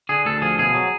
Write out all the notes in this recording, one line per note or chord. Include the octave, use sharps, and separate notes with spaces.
D3 G#4
D2 A4
F3 G#4
B2 G#4
F#3